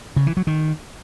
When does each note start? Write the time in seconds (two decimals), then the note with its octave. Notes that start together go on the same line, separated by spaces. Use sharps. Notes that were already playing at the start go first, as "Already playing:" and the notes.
0.16 C#3
0.27 E3
0.37 F#3
0.47 D#3